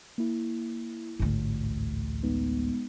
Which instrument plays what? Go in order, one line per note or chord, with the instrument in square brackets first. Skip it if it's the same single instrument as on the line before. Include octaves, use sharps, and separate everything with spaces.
[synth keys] A#3 E4
[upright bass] A1 D2 [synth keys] G#2
[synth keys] G#3 B3 D#4